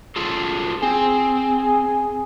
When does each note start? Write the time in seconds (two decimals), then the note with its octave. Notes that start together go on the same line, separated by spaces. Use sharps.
0.16 F4 G#4 A4
0.83 C4 G#4